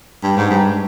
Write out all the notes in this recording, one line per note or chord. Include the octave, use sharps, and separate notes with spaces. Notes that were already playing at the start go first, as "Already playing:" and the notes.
G2
G#2
G2